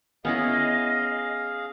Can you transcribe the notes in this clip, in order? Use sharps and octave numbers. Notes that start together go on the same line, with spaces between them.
B3 C#4 E4 G#4 D#5 F5